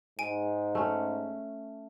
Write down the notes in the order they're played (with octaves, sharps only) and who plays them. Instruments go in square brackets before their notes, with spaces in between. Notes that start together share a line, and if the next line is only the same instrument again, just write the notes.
[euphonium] G#2 [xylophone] G#5 D7
[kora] A3 C#4